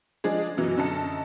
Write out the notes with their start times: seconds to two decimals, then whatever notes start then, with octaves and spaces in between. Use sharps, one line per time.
0.24 F3 G#3 D4 G#4
0.57 F#2 B2 E3 F#3
0.77 F#2 D3 D#4 D#5 A5 C#7